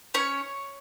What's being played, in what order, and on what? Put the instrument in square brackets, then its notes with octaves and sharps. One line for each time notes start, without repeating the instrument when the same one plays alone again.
[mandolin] C#4 C#5